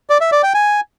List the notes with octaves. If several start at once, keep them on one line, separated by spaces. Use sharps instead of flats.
D5
E5
D5
G5
G#5